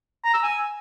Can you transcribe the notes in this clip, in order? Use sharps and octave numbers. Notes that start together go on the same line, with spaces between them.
A#5
E6
G#5